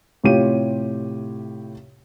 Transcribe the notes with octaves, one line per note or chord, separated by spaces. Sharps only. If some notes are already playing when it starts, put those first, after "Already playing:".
A2 C3 F4 G4 C#5 D#7